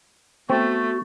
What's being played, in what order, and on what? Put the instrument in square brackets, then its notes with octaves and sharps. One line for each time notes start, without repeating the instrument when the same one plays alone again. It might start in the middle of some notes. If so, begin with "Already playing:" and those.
[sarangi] A3 [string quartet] B3 [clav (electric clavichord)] C4 [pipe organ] F#4